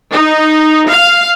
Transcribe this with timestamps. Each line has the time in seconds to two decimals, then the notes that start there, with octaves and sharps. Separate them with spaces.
0.12 D#4
0.89 F5